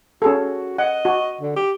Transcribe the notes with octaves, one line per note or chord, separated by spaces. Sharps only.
C#4 F#4 G#4 A4
D#5 F#5
F#4
D3
G4